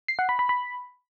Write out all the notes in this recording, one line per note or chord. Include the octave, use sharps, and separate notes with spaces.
C7
F#5
B5
B5
B5